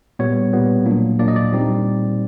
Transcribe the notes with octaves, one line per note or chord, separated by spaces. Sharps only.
A#2 G3 B3 C#5
A#2 G3 B3
A#2 F#3 A#3 D4
A#2 F#3 A#3 D4 D5
D#5
D5
A#2 G3 C4 D#4